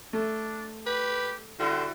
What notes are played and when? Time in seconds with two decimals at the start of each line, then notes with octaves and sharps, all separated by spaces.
0.13 A3 D4
0.86 G4 B4
1.59 D3 G3 E4 F#4 C5